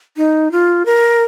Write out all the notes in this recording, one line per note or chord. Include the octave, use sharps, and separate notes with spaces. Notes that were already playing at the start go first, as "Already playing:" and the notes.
D#4
F4
A#4